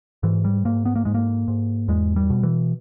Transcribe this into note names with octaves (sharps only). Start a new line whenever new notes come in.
G#2 E3
G3
G#2 A#3
B3
A#3
G#2 G#3
A#3
G#2
E2 G#3
G3
B2
E3